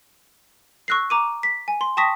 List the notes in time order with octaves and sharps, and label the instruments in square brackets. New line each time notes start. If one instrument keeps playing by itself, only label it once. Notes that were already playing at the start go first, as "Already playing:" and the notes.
[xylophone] C#6 E6 F#6 A#6 C7
A#5 D6 D#7
B6
G#5
C6
G5 A5 C#6 D#6 A#6 B6